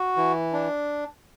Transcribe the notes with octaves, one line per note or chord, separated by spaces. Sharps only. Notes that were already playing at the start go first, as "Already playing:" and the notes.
Already playing: F#4
E3
D4